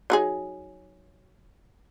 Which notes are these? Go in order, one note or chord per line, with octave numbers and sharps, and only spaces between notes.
F#3 D#4 G#4